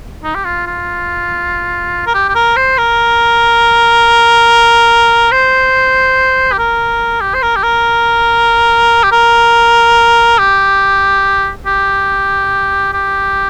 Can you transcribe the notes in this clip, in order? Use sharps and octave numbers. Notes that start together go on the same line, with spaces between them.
D#4
G4
F4
F4
A#4
G4
G4
A#4
C5
A#4
C5
G4
A#4
G4
C5
A#4
G4
A#4
G4
A#4
G4
G4
G4